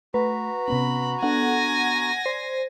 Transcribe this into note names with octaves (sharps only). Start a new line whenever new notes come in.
A3 F#4 B4 A#5
C3 B3 C#4 B5
B3 D4 A4 F#5 G#5 A#6
C5 D5